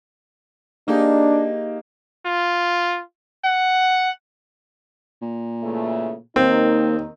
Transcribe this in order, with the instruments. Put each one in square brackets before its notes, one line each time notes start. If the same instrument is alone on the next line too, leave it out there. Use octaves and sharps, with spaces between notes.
[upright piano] A#3 G4 G#4 [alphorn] D4 [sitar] D#4
[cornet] F4
F#5
[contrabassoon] A#2
[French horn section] C#3 E3 A3
[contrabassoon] D#2 [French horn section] D#3 D#4 [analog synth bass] A#3 [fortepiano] C4